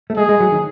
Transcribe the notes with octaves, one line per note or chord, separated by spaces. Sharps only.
A3
G#3 G#4
G#3
F#3
D#3